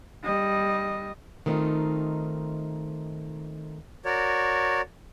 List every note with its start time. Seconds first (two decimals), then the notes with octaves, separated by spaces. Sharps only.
0.23 G3 D#5
1.46 D#3 A3 B3 C4 D#4 F4
4.05 F#4 A#4 C#5 D5